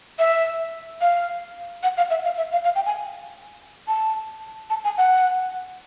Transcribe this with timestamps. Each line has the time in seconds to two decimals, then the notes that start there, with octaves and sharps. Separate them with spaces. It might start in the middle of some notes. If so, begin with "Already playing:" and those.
0.19 E5
1.01 F5
1.83 F#5
1.97 F5
2.10 E5
2.24 F5
2.37 E5
2.52 F5
2.64 F5
2.75 G5
2.86 G#5
3.88 A5
4.70 A5
4.84 G#5
4.98 F#5